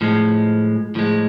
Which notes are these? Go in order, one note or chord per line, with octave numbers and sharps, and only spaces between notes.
A2 F3 G#3
A2 F3 G#3